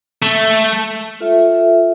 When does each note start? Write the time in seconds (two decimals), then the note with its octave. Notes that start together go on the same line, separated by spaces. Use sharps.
0.22 A3
1.20 F4 A4 E5